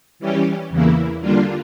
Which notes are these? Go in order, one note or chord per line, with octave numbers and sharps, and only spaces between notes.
E3 G3 C#4 G4
E2 C#3 E3 A#3 E4
D3 G3 A#3 D4 F4